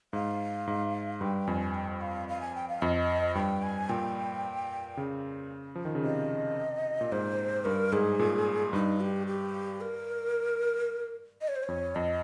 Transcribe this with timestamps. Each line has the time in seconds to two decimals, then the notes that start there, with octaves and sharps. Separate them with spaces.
0.13 G#2 F5
0.67 G#2
1.21 G2 G5
1.47 F2 G#5
1.74 G5
2.01 F5
2.28 F5
2.41 G#5
2.55 G5
2.69 F5
2.82 F2 D#5
3.35 G2 G5
3.63 G#5
3.89 A#2 G5
4.97 C#3
5.75 F3
5.85 D#3
5.95 C#3
6.04 C3 D#5
7.01 A#2
7.12 G#2 C5
7.65 G2 A#4
7.92 G#2 G#4
8.19 A#2
8.73 G2 D#4
9.00 G4
9.27 G4
9.81 A#4
11.41 D#5
11.48 C#5
11.56 C5
11.63 F2 C#5
11.95 F2 D#5